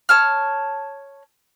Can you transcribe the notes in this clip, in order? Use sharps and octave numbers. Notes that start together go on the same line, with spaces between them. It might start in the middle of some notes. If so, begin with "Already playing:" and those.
C#5 A5 F6